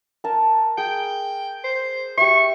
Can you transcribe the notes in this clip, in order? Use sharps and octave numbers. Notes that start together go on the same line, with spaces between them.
A#4 A5
G#4 G5
C5
G4 C#5 E5 C#6